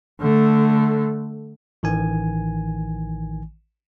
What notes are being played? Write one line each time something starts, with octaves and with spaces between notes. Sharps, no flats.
D3 A3
A1 D#3 E3 G#5